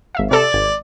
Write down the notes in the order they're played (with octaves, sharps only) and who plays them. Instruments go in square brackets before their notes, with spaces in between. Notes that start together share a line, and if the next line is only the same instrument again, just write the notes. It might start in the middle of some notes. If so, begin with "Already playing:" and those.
[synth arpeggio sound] G#1 E5 F5
[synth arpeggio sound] C3 A4 A5 [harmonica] D5
[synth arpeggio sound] G#1 G#6